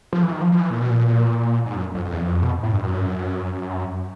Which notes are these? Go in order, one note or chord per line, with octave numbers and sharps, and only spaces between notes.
F3
E3
D#3
F3
F3
E3
A#2
B2
A#2
G#2
F#2
F2
F2
E2
F2
B2
A2
G2
F#2